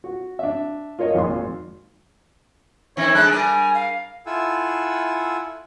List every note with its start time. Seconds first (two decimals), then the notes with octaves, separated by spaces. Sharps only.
0.04 F#4
0.39 D4 E5
0.99 F4 A#4 C#5 D#5
1.14 G#1 F2 A#2 C6
2.97 D#3 C4 E4 C#5
3.15 G3 G#3 D4 A4 F#6
3.31 A#4 D5 G#5
3.75 F5
4.26 E4 F4 A4 F#5 G#5 E6